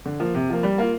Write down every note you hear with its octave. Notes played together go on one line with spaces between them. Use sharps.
D3
F3 A#3
C3
F3 A#3
G3
A#3 F4